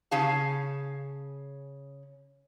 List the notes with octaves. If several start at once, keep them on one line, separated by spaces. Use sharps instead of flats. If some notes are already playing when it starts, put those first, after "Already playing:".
C#3 C#4 G#4 F5 A5